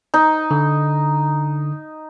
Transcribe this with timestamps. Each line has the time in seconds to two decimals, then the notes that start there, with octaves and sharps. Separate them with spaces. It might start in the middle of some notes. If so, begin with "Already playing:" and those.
0.14 D#4
0.51 D3